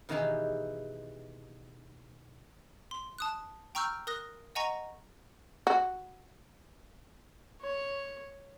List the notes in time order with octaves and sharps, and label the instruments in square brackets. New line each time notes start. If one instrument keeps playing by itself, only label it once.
[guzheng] B2 D#3 E3 D#4 G4 G#4
[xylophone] C6
A5 D#6 F#6
G5 A#5 C#6 E6 F6 G6
A#4 D#6 F#6 A#6
D#5 F#5 G#5 A#5 C#6 A#6
[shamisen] F#4
[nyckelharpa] C#5